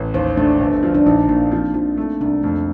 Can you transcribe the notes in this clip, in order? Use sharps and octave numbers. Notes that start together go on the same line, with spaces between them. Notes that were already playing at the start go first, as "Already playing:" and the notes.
Already playing: A1
D#2 C5
A3 D4
G1
F3
D4
A#1 D#4
A#1 A#3
F3 C4
F3 D4
A3 C4
C2 D4
F2 A3